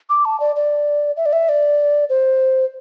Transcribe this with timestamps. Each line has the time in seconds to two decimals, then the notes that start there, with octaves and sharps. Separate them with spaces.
0.10 D6
0.25 A5
0.40 D5
0.56 D5
1.17 E5
1.26 D5
1.33 E5
1.49 D5
2.10 C5